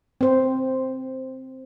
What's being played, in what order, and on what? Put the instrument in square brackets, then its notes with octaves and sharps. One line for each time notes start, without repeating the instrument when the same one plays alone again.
[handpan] C4 C5